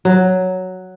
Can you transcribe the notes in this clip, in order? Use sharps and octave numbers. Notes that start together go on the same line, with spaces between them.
F#3